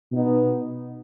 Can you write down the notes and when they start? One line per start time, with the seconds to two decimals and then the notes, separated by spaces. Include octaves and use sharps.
0.10 B2 B3 D#4